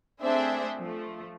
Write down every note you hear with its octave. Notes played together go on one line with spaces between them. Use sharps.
A3 C4 D4 G#4 C5 E5
F3 A3